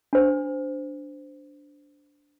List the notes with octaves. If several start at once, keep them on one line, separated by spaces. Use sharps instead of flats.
D4 C5